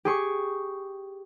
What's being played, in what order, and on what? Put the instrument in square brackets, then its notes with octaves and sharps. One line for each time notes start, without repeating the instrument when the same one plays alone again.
[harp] G4 G#4 C#6